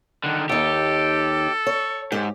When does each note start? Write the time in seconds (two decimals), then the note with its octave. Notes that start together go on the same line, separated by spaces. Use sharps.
0.24 D3 D#3 F#5
0.49 D#2 D#4 G4 A4
1.66 C#5
2.12 G#2 G4